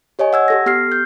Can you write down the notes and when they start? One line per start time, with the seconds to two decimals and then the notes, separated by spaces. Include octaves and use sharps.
0.19 G4 C#5 D#5 G#5
0.33 F#5 E6 G#6
0.48 G4 A4 A#6
0.66 B3 G4 F6 C7
0.92 G6